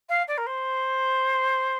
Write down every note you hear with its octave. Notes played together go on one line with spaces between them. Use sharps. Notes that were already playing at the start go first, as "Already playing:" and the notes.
F5
D5
A#4
C5